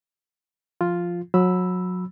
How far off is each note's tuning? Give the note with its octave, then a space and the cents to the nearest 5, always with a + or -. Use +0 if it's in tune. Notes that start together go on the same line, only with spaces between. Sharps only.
F3 +0 F4 +0
F#3 -25 B5 -5 E6 +0